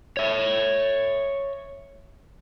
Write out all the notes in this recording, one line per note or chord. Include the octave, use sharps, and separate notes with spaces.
C#5 E5